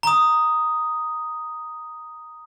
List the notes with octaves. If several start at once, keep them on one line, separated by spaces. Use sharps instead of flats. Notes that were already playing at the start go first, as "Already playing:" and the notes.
A#5 D#6